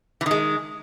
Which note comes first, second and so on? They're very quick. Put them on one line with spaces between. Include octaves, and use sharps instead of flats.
E3 D#3 G#3